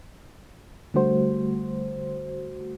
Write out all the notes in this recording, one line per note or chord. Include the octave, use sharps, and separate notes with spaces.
D3 G3 A3 F#4 C5